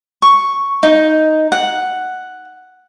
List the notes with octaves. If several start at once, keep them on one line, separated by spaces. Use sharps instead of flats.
C#6
D#4
F#5